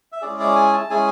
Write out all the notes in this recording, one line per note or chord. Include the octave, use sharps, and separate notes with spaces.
E5
G#3 C#4 E4 G#4 D5
D5
G#5
A5
G#3 C#4 E4 G#4 G#5